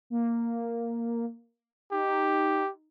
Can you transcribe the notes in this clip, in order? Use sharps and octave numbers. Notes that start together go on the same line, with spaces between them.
A#3
D#4 G4